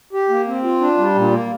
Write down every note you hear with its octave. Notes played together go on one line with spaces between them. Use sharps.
G4
A#3
C4
F4
D4
G3
A#2
A#3